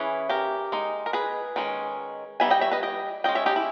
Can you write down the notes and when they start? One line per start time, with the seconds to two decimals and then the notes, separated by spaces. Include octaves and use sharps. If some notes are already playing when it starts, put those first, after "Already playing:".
Already playing: E3 C#4 G#4 B4
0.29 G4 A#4
0.72 G#3 D#4
1.06 A#4
1.13 G#4 B4
1.56 D#3 G#3 C#4
2.40 G3 B3 D#4 E5 G#5
2.50 D#5 G5
2.61 C#5 E5
2.71 B4 D#5
2.83 D#5 G5
3.24 G#3 C#4 D#5 G5
3.35 C#5 E5
3.46 D#4 G4
3.56 E4